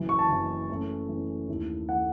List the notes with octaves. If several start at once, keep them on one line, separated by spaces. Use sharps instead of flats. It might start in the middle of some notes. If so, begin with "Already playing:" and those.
Already playing: F#1 F#2 E3
C#6
A5
F#1 F#2 E3
F#2 E3 A3 C#4
F#2 E3 A3 C#4
D#2 D#3 A3 E4
D#3 A3 E4 F#5